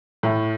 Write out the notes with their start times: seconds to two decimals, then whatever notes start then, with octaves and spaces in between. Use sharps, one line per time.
0.23 A2